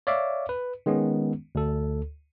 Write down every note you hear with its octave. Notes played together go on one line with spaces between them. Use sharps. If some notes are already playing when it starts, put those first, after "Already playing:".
C#5 D5 E5 F5 D6
B4
D#3 G#3 B3 C#4
D2 A4